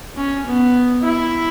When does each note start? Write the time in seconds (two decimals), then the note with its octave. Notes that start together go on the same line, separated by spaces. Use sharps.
0.17 C#4
0.46 B3
1.03 E4